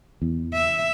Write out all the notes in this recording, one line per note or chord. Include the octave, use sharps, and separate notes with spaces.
E2
E5